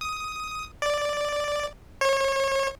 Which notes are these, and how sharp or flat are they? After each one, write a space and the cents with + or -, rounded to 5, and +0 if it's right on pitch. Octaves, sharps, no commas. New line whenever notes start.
D#6 +10
D5 +0
C#5 -35